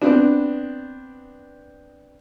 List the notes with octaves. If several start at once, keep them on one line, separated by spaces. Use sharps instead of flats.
B3 C4 D4